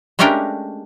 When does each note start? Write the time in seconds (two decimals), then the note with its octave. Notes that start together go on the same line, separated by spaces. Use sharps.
0.19 G#3 A3 C#4 D4 G4 A#4